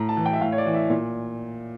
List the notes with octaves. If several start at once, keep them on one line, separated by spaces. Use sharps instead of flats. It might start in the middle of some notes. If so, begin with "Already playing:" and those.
Already playing: A2 A#5
A5
E3
G5
E5
A2 F5
C#5
D5
E3
E5
A#2